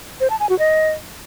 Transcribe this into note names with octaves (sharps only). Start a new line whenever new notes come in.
C5
A5
G#5
F#4
D#5